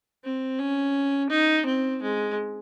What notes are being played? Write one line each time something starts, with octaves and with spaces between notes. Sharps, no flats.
C4
C#4
D#4
C4
G#3